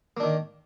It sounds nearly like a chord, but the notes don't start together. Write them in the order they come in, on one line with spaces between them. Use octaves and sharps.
A#3 D4 D#3